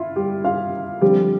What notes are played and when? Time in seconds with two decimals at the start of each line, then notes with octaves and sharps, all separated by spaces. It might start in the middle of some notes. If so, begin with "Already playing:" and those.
Already playing: E4 F4
0.16 G3 G4
0.44 F4 F5
1.01 D3 F3 G3 C4 G4